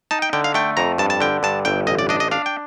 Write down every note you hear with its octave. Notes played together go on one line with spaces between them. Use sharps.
D#4 A5
G5
D3 G5
F5
A3 G5
F2 A#5
G2 A5
A5
D3 G5
G2 A5
G1 G5
A1 D#5
D5
D4 D#5
D#5
D4 F5
G5